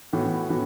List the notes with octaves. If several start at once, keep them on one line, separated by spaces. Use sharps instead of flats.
A2 E3 B3 F#4
A2 E3 B3 F#4